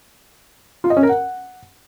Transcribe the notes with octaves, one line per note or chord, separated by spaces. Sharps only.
F4
D#5
C#4
A#4
F#5